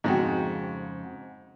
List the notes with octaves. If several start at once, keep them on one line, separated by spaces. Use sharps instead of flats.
F2 G#2 C#3 B3 C4 F#4 G5